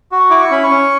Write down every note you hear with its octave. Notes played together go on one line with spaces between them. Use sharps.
F#4
E4 D6
C#6
C#4 B5
C#6
C#4